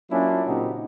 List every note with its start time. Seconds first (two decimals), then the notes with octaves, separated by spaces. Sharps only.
0.11 F#3 A#3 C#4 D4 E4 F4
0.46 A#2 C#3 C4 D#4 F#4 G4